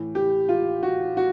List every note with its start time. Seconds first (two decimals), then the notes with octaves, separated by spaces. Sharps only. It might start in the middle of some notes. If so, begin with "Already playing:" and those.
Already playing: A2 E3
0.15 G4
0.49 F4
0.83 F#4
1.17 F#4